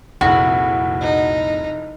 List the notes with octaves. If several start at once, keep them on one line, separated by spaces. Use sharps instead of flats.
F1 C2 F2 A#2 E4 F#4 G#4
D#4